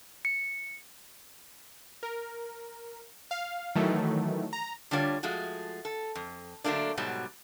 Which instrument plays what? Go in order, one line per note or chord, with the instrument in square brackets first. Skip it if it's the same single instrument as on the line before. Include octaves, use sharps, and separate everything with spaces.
[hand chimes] C#7
[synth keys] A#4
F5
D#3 E3 F#3 A3
A#5
[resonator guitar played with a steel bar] D3 G3 D4 F4 C#5
F3 G#3 A3 F#4
A4
F2
D3 F#3 A3 A#3 D4
G#2 B2 F#3 G3